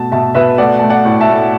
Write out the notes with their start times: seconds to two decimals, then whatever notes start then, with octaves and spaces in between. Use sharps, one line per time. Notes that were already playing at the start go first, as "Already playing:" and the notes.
Already playing: B2 A3 A5
0.12 B2 E5 A5
0.35 B2 B4 E5
0.58 A3 D5 F#5
0.79 A3 A5
0.90 D5 F#5
1.05 A2
1.21 E5 A5
1.28 A3